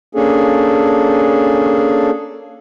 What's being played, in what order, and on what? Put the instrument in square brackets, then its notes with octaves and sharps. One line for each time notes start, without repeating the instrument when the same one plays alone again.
[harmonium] A#3 C#4 D4 G#4 A4